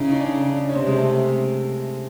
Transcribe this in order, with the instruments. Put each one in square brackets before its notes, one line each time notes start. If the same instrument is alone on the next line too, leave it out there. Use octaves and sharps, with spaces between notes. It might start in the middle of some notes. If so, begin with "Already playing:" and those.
Already playing: [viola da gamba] C#3 [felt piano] D#4 E4
[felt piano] D#4
D4
D4
C#4
[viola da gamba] C3 [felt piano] C4
[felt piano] G#3
A3